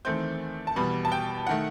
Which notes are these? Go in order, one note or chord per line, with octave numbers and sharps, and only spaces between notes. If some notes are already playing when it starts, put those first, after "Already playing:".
E2 D#3 A3 C4 G6
A5
E2 B2 G3 B3 B5
A5
G5
D#3 A3 F#5